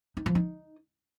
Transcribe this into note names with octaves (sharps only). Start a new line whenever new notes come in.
D#4
F3
D#4